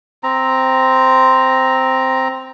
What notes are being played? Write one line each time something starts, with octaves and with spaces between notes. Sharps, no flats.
C4 A#5